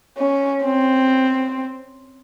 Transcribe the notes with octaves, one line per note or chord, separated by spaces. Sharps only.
C#4
C4